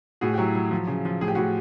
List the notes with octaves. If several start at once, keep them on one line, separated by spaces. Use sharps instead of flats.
A2 F#4 G#4
G4
F#3 E4 F#4
F#3
F3
C#3
F3
A2 G#4
G4
A2 F#4 G#4